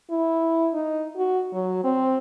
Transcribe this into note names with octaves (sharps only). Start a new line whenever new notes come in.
E4
D#4
F#4
F#3
C4